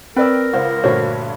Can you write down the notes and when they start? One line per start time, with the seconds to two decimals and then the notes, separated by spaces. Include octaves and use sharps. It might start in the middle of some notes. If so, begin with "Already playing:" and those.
0.16 C4 A#4 B4 D5 G5 E6
0.53 C#2 C5 F5 F#5
0.84 D2 G2 A#2 D3 F#4 C5 C#5